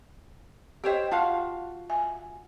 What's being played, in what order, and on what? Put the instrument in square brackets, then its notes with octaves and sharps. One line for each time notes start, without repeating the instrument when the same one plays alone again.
[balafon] G4 D#5 [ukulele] C5 C#5 G5
[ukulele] F4 F#4 F5 [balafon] A5
[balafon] E5 G#5